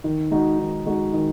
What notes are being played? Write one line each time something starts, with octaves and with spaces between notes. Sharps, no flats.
D#3
G#3 D#4 F#4
D#3
G#3 D#4 F#4
D#3